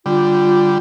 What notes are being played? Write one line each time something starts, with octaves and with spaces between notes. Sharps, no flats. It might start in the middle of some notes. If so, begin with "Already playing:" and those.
D3 G3 F4